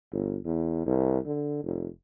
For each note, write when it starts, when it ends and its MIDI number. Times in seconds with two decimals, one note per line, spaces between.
0.12 0.37 31
0.45 0.84 40
0.86 1.18 36
1.26 1.61 50
1.64 1.88 29